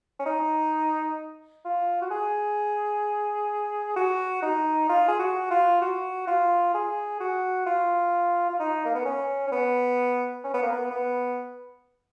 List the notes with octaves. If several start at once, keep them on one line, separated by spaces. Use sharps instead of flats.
C#4
D#4
F4
F#4
G#4
F#4
D#4
F4
G#4
F#4
F4
F#4
F4
G#4
F#4
F4
F4
D#4
A#3
B3
C#4
C#4
B3
C#4
B3
A#3
B3
B3